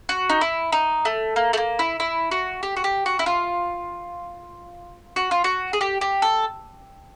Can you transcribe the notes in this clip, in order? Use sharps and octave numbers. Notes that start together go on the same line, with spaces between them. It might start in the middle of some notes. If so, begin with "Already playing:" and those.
F#4
D#4
E4
D#4
A3
A#3
A3
A#3
E4
E4
F#4
G4
F#4
G4
F#4
E4
F4
F#4
F4
F#4
G#4
G4
G4
A4